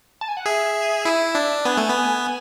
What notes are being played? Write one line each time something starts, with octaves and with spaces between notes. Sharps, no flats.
A5
G#5
F#5
G#4 E5
E4
D4
B3 G#5
A3
B3